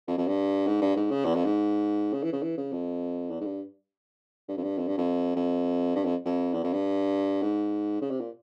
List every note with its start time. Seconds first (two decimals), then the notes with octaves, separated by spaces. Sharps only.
0.08 F2
0.18 F2
0.28 G2
0.66 G#2
0.81 G2
0.96 G#2
1.11 C#3
1.25 E2
1.35 F2
1.45 G#2
2.13 C#3
2.23 E3
2.32 C#3
2.43 E3
2.57 C#3
2.72 F2
3.30 E2
3.40 G#2
3.45 G2
4.48 G2
4.57 F2
4.63 G2
4.78 F2
4.87 G2
4.97 F2
5.36 F2
5.95 G2
6.04 F2
6.25 F2
6.53 E2
6.63 F2
6.73 G2
7.42 G#2
8.01 C#3
8.10 C3
8.20 A#2